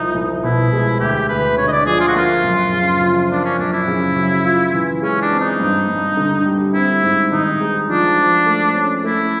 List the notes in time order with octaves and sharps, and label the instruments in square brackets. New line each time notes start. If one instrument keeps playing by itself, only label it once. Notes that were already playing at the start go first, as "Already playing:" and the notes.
Already playing: [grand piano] C2 F3 [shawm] D#4
[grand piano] C2
[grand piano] B2 [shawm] E4
[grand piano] G#3
[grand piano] D2 [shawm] G4
[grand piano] D2 [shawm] B4
[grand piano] D3 [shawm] C#5
[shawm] D#5
D5
[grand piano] F3 [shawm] G#4
[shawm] F4
F#4
[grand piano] A#3 [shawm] F4
[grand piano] F#2
C#3
F3
[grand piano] A#3 [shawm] D4
[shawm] C#4
[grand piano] F#2 [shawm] D4
[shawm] E4
[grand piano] C#3
F#3
F4
E3
[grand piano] G#3 [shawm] C#4
[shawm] D4
[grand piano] C4
[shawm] D#4
[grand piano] G2
G2
D3
G3
[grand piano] C4 [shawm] E4
[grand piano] G#2
[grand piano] D#3 [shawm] D#4
[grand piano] G#3
[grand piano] F3 [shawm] D4
[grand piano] F3
A3
C#4
[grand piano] A3 [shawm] E4